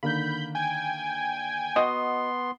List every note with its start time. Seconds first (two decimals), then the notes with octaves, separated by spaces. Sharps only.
0.03 D3 D#3 A#3 B5 G6
0.55 G5 G#5 G#6
1.76 B3 F#4 D#5 C6